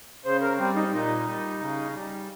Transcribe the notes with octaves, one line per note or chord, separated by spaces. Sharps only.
C#3 C5
A#4
G3 C4
D#4
A#2 D#4
G3
C#3
G3